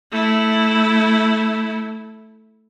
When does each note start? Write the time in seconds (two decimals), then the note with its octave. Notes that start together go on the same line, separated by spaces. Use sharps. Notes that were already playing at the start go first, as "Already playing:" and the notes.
0.12 A3 E4